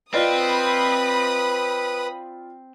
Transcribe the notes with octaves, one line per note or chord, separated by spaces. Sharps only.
C4 F4 B4 D5 D#5 B5 D#6